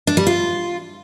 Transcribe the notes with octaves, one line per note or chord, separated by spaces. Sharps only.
D4
G3
F4